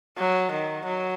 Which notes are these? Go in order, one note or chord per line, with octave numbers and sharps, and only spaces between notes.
F#3
D#3
F#3